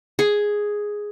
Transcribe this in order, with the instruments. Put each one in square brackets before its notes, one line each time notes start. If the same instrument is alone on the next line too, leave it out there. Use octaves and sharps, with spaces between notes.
[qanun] G#4